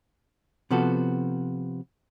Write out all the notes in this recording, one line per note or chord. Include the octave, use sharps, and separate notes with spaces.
C3 F3 B3 F#4 A4